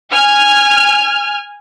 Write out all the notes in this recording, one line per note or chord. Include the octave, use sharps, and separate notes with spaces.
G#5 F6